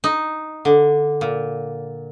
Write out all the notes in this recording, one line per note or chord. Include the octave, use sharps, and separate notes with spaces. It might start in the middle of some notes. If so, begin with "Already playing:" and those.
D#4
D3
A#2